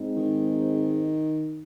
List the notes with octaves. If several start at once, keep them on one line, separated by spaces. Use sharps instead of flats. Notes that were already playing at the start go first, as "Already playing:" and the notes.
Already playing: G#2 G#3 C4 D#4
D#3